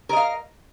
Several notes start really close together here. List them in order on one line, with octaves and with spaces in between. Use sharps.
A#4 D#5 F5